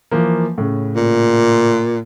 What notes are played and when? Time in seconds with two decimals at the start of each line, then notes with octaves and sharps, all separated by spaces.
0.11 E3 F3 A#3
0.58 A2 C#3
0.96 A#2